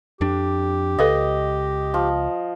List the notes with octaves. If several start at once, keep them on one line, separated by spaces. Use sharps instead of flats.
F2 D4 G4
C#2 A4 B4 D#5 F5
F3